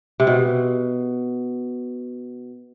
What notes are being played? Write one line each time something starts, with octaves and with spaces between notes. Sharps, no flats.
C3
B2